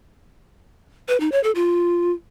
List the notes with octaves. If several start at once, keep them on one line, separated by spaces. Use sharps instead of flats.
B4
D#4
C#5
A4
F4